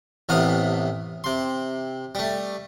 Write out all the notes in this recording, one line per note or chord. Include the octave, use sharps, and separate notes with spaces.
A1 A2 C3 B3 F5 D#6
C3 C6
G3 A3